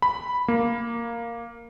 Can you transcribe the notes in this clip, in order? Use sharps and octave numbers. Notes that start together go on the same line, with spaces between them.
B5
A#3